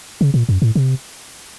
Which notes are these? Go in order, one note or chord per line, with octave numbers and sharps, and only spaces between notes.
C#3
A#2
F#2
A2
C3